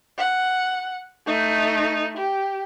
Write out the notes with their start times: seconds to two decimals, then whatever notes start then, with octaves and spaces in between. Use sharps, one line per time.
0.18 F#5
1.27 A3 D#4
2.17 G4